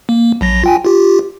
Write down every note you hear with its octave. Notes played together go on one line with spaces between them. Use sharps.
A#3
A#1 F#3 A#6
F4 G5 G#5
F4 G4